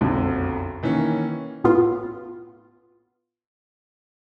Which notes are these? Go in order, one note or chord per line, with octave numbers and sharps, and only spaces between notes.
F#1 B1 F2 D3
D#3 E3 A#3 C#4
A2 B3 F4